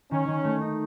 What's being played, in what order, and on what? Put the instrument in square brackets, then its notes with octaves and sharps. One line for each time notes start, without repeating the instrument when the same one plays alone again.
[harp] D#3 [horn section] C#4
[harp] D#3
A3
D#4